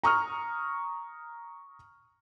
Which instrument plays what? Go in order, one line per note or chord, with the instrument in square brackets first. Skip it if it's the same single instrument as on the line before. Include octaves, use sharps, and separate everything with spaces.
[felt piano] A#5 C#6 D#6 F6